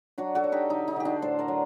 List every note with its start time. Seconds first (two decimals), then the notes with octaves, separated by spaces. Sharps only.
0.18 F#3 D4 F#4
0.35 F#4 A4
0.44 F#3
0.52 D#4 G4
0.70 D3 D#4
0.88 D#4
0.96 D3 G4
1.05 D4 F#4
1.22 A2 A4 C5
1.39 A#4 D5
1.48 F#3